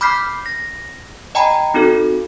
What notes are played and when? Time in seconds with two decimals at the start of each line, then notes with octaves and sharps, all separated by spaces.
0.01 B5 D6 F6 G6 B6 C7
0.46 A#6
1.35 D#5 G5 G#5 A#5 B5
1.74 C4 D#4 F#4 A4